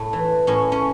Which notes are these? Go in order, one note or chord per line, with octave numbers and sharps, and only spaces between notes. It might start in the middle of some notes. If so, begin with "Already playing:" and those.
Already playing: A2 A3
E3
A2 C#4
C#4